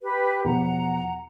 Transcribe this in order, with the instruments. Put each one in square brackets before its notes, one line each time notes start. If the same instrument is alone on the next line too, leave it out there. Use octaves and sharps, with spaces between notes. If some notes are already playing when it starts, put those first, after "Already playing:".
[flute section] G4 B4
[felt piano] E2 B2 F3 [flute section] F#5 A#5